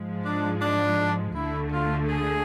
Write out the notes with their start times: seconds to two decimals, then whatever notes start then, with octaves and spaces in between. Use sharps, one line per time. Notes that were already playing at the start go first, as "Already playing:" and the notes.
Already playing: G#2 F3 G#3
0.26 D4
0.62 D4
1.35 D2 D3 A3 E4
1.73 F4
2.09 G#4